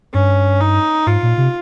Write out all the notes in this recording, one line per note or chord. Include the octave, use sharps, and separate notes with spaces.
G2 C#4
D#4
G#2 F4
A#2
C3